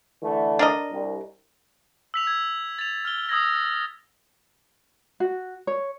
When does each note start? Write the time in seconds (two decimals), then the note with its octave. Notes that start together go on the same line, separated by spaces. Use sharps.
0.22 D3 E3 A3
0.59 D4 A#4 D#5
0.91 C2
2.14 E6 B6 F7
2.27 G#6
2.79 A6 F7
3.05 F6 G7
3.29 D#6 E6 G#6 A#6
5.20 F#4
5.67 C#5